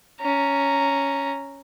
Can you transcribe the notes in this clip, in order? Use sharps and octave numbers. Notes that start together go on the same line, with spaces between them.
C#4 A#5